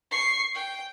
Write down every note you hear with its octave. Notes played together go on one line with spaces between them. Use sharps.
C#6 C7
G5